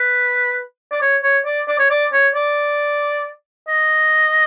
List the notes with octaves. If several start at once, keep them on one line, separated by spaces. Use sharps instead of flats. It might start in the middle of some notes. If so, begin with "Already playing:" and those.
Already playing: B4
D5
C#5
C#5
D5
D5
C#5
D5
C#5
D5
D#5